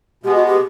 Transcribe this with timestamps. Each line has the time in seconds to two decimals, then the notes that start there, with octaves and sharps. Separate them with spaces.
0.24 B2 G#3 B3 G4
0.35 F#4
0.47 G4